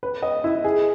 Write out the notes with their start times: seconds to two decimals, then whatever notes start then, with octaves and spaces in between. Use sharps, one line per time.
0.03 B4
0.22 D#5
0.44 E4
0.64 G#4